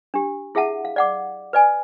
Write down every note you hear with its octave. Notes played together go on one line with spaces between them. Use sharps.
D4 G4
E4 G#4 E5 F#5 A5
F5
D5 F#5 D6
B4 D5 G#5